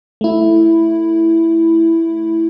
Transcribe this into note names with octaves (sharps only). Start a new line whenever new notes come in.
A3 E4